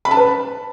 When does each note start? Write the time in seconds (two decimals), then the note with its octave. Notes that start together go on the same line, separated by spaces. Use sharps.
0.05 B5
0.11 A5
0.17 B4